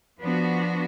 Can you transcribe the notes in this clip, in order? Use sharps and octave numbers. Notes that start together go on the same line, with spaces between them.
F3 B3 D4 F#4